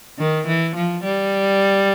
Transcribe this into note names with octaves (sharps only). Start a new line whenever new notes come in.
D#3
E3
F3
G3